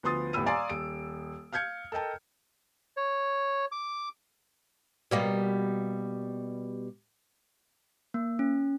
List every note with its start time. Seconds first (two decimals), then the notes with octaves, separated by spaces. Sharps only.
0.03 D2 F3 B3 C6 D#6 A6
0.33 D#1 A2 B3 B5 E6 D#7
0.46 D5 F5 G#5 A#5 C6
0.70 D#1 D7
1.53 F5 F6 G6 G#6 C#7
1.92 A4 A#4 D#5 G5 A5
2.97 C#5
3.72 D6
5.11 B2 G3 A#3
8.14 A#3
8.39 C#4